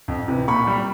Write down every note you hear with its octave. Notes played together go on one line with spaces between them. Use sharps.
F2
C3 E3
A#2 B5 C#6
G3